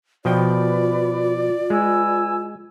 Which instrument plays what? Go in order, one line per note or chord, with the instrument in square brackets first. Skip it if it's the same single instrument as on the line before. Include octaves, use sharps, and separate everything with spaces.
[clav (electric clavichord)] B2 F3 G5 [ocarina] F4 [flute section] B4 [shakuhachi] D5
[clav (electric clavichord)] G#3 [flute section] B4 G#5 E6